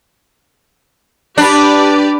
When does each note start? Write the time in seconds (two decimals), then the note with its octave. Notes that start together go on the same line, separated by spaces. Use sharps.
1.38 D4 G4 B4 D5